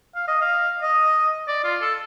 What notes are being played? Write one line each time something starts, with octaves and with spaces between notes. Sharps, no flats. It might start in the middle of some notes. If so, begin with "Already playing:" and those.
F5
D#5
F5
D#5
D5
F4
A4